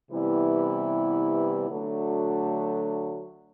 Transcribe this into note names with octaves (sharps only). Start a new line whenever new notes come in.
C3 E3 G3 B3 E4
D3 F#3 A3 D4 F#4